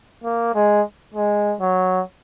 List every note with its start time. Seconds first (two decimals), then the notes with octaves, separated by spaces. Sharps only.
0.24 A#3
0.54 G#3
1.14 G#3
1.60 F#3